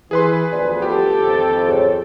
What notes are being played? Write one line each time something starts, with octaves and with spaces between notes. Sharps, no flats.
E3 G#4 B4 C6
D2 F3 B3 D5
G4 A4 G5
F2 C5
G#4 C#5